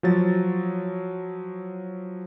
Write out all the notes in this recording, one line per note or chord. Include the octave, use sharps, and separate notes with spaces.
F3 F#3 A6